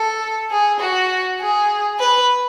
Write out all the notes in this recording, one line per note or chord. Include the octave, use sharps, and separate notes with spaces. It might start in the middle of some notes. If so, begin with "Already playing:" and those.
Already playing: A4
G#4
F#4
G#4
B4